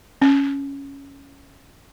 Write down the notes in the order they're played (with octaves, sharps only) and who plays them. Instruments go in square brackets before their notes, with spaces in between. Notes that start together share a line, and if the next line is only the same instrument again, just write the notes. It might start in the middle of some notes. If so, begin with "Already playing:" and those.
[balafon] C#4